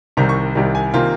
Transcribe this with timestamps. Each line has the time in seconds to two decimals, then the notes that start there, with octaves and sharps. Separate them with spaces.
0.17 C2 C3 D#3 G3 A#5
0.29 C#6
0.55 C2 C3 D#3 G3
0.75 G#5
0.94 C3 D#3 A#3 F4